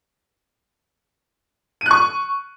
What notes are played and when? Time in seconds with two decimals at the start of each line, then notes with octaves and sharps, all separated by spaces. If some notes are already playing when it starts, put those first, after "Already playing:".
1.81 D#7
1.86 F#6
1.91 C#6